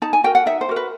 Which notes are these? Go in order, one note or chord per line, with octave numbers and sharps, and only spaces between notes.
D#4 A5
G#5
F#4 A#4 G5
F#5
D#4 E5
C5
F#4 A#4
B4